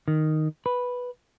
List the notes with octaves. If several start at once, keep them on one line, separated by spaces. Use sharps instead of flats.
D#3
B4